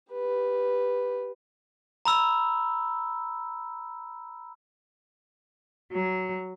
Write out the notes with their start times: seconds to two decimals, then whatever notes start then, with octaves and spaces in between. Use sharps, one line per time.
0.12 G4 B4
2.05 A#5 B5 E6
5.91 F#3